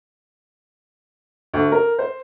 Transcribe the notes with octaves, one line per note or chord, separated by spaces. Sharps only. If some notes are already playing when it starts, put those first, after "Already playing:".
D2
A#4
C5